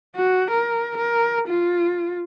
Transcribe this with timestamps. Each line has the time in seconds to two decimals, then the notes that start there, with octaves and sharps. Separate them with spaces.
0.15 F#4
0.51 A#4
0.97 A#4
1.47 F4